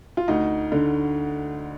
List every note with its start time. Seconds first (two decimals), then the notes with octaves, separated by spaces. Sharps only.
0.17 F4
0.28 D2 D#4
0.72 D3